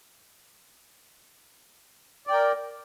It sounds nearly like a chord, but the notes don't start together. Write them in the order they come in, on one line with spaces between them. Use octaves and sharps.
D5 G5 A#4